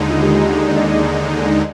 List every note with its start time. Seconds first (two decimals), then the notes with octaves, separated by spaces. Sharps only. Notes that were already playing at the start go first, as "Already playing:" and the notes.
Already playing: D#2 D3 G#3 D#4
0.10 F4
0.22 G4
0.68 D5
0.77 D#5
0.85 D5